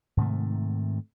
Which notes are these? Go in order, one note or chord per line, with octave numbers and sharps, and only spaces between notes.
G#2 C3 D#3 A3